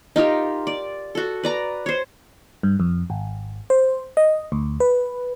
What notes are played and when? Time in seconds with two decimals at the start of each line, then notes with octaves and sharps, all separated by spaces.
0.16 D#4 F4 G4 A#4
0.67 D5
1.15 F#4 A4
1.43 B4 D5 A#5
1.86 C5 C#5
2.63 G2
2.80 F2
3.10 G#1
3.70 C5
4.17 D#5
4.52 D2
4.80 B4